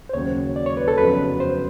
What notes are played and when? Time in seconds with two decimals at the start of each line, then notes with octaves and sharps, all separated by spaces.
0.09 C5
0.13 D#2 C#3 F#3 C#5
0.56 D5
0.66 C#5
0.77 B4
0.88 A4
0.97 F2 C#3 F#3 B3 D#4 B4
1.40 C5